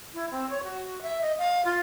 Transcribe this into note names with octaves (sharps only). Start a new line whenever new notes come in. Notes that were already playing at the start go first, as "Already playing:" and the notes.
E4
C4
C#5
F#4
E5
D#5
F5
F4